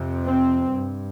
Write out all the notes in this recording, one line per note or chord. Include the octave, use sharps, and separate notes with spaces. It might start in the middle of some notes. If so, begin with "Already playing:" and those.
Already playing: F2 C3
C4
G2